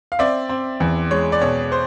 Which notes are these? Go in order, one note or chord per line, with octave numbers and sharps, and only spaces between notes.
F5
C4 D5 E5
C4
E2
G#3 C#5
D5
B2 C#5
C5